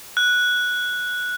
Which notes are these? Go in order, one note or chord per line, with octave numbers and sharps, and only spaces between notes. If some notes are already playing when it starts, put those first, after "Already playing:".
F#6